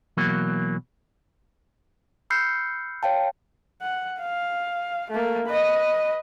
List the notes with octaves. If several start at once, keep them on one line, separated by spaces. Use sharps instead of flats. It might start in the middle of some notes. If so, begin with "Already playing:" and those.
B2 E3 F#3 A#3
B5 E6 F6 G6 C7 C#7
C#5 F5 G5 A5
F#5
F5
A3 A#3
B4 D#5